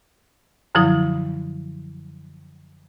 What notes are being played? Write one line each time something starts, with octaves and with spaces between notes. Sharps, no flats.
F#2 D3 F3 F#3 E4 D#6